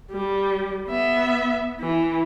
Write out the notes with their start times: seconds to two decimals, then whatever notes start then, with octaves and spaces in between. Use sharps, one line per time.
0.11 G3
0.88 B3 E5
1.80 E3